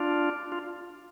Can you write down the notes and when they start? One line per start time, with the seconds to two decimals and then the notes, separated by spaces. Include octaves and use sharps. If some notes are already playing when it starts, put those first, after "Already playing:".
Already playing: D4 F4
0.52 F4